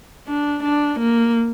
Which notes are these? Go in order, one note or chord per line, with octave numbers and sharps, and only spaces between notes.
D4
D4
A#3